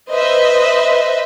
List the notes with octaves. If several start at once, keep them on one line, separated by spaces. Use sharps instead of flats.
B4 C5 D#5 E5